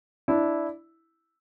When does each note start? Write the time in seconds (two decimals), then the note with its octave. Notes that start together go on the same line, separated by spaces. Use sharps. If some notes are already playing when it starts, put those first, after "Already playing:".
0.28 D4 E4